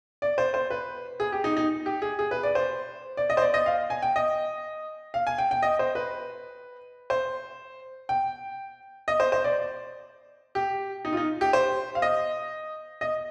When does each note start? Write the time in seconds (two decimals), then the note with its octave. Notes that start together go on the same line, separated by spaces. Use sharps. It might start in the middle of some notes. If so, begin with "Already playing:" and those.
0.22 D5
0.38 C5
0.54 C5
0.70 B4
1.20 G#4
1.32 G4
1.44 D#4
1.57 D#4
1.86 G4
2.02 G#4
2.19 G#4
2.31 B4
2.43 D5
2.55 C5
3.17 D5
3.30 D#5
3.37 C5
3.42 D5
3.54 D#5
3.66 F5
3.90 G#5
4.02 G5
4.16 D#5
5.14 F5
5.27 G#5
5.38 G5
5.51 G5
5.63 D#5
5.79 C5
5.95 B4
7.10 C5
8.09 G5
9.08 D#5
9.20 C5
9.32 C5
9.44 D5
10.55 G4
11.05 D#4
11.13 F4
11.17 D#4
11.41 G4
11.53 C5
11.95 F5
12.02 D#5
13.01 D#5